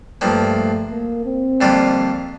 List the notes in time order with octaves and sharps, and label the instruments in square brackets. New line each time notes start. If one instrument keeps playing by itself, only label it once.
[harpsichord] G2 F3 A#3 [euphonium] A3
[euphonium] A#3
C4
[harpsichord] F2 D3 G3 A#3 F4